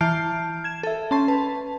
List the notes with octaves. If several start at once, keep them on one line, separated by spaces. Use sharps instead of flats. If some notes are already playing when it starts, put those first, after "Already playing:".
E3 A5 F6 G6 C7 D7
G#6 E7
A4 E5
C#4 A5 C6 A6
B4 A5